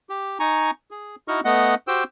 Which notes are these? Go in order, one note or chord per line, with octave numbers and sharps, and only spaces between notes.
G4
D#4 G#5 A#5 C#6
G#4
D#4 E4 F#4 D#5 C#6 F6
A3 B3 D#5 F#5
F#4 G4 C5 G5 E6